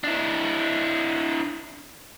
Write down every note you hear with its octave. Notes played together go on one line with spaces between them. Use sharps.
D4 E4